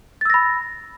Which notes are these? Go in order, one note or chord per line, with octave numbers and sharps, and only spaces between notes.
B5 E6 A6 A#6